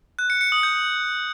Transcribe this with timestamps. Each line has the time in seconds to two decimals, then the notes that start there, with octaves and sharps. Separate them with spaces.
0.19 F#6
0.30 C#7
0.41 C#7
0.52 D#6
0.63 G6